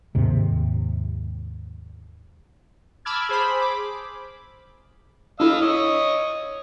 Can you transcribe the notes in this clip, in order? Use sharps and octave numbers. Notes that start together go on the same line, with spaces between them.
D#2 G#2 C3
A5 B5 D6 E6 F6 G#6
G#4 C5 B5
D6
D4 E4 A4 D#5 F5 E6
C#5 D#5